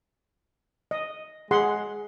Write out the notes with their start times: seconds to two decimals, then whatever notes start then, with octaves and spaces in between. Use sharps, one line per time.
0.91 D#5
1.51 G#3 G#4 F#5 C6